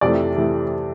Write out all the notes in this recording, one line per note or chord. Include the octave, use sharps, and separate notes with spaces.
F2 C3 E3 A3 D5
C3 E3 A3